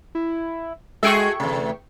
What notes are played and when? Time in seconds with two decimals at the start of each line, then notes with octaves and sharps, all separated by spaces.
0.15 E4
1.03 G#3 F#4 G#4 A4 E5 G5 C#6
1.40 E2 C3 A3